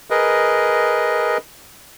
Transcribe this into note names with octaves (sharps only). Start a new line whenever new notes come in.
G#4 A#4 B4 D#5